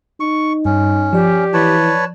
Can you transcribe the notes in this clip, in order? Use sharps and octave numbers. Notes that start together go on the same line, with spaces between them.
D#4 C#6
G2 C#4
F3 G4 D5
E3 B4 C#5 A5